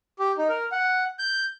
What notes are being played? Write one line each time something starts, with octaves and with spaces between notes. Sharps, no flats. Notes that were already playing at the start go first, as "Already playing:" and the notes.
G4
D#4
A#4
F#5
G6